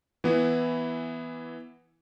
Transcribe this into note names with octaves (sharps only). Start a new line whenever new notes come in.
E3 B3 E4